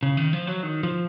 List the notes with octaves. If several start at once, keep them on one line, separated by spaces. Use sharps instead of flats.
C#3
D#3
F3
F#3
D#3
F3